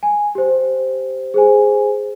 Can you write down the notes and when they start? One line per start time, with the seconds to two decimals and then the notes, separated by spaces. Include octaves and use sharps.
0.03 G#5
0.35 G4 C5
1.34 G#4 C5 G#5